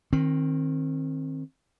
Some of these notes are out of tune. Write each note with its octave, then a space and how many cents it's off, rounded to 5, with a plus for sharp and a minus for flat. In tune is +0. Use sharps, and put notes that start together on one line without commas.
D#3 +0 C4 +25